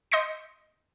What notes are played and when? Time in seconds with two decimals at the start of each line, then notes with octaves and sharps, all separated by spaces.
0.12 D#5 C6 G6 A#6 C#7